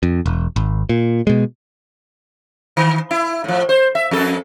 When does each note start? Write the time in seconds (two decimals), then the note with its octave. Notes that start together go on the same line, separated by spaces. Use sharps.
0.03 F2
0.26 E1
0.56 G#1
0.89 A#2
1.27 B2 G#3
2.77 D#3
3.11 E4
3.44 A2 F3
3.69 C5
3.95 E5
4.11 F2 A4